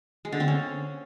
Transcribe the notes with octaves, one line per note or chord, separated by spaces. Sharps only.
G#3
D3
C4
C#4